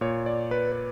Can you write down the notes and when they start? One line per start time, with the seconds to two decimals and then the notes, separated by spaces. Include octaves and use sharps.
0.01 A#2 C#5
0.26 D5
0.51 B4
0.72 B4